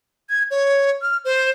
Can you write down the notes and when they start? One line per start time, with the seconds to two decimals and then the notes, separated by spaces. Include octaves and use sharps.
0.30 G#6
0.51 C#5
1.02 F6
1.25 C5